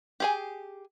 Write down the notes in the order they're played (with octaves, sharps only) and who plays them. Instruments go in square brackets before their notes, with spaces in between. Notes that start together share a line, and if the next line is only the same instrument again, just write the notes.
[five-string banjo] G4 G#4 G#5